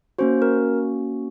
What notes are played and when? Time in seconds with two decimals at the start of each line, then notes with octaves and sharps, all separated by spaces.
0.18 A#3 C#4 F#4 C5
0.42 A#4